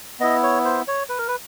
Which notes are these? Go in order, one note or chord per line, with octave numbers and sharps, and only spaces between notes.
B3 E4 D#5
C#5
C5
C#5
B4
A#4
B4